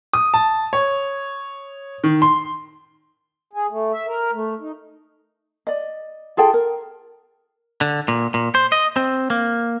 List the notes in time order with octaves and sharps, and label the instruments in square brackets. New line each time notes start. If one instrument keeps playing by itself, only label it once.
[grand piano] D#6
A5
C#5
D#3
C6
[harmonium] G#4
A3
E5
A#4
A3
D#4
[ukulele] D5 D#5
F4 G#4 A4 G5
A#4
[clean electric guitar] D3
A#2
A#2
C5
D#5
C4
A#3